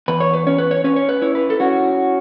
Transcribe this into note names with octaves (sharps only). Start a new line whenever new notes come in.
E2 B4
C#5
B4
C#4 C#5
B4
C#5
C#4 B4
C#5
B4
E4 C#5
B4
A4
C#4 F#4